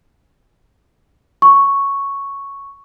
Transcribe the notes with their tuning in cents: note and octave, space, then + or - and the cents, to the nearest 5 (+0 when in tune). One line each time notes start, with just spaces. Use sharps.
C#6 +0